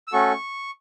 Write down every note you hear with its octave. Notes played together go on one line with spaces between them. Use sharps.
E6
A3 C#4 F#4 A4 C#6